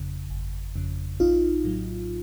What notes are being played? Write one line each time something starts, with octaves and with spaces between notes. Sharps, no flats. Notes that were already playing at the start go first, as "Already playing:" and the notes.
Already playing: G1 F2 C#3
G1
F2 C#3
A#1 D#4 F4
A2 F#3